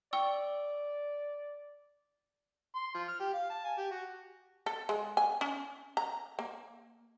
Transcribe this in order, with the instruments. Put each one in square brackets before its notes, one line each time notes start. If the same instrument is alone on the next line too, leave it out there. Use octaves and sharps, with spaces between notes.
[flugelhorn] D5 [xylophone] G5 C#6 E6
[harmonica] C6
F3
F6
G4
F5
A5
G#5
G4
F#4
[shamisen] A4
G#3
G#5
C#4
A#5
A#3